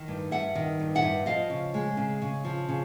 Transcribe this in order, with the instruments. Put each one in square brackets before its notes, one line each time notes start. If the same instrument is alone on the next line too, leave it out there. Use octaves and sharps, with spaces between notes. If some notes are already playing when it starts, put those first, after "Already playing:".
Already playing: [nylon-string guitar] D#3
G2
G2 E5 F#5
D#3
G2
E5 F#5
G2
F3 D#5 F5
C#3
G#3
C#3
C#3
F3
C#3